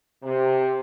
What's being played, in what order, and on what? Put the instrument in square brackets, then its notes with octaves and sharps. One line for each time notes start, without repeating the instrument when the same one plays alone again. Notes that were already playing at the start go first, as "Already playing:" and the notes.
[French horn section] C3